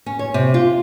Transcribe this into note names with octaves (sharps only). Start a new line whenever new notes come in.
C#4
C#5
C3
F4